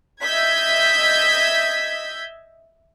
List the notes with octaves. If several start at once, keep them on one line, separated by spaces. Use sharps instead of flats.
D#5 E5 E6 G6 G#6 B6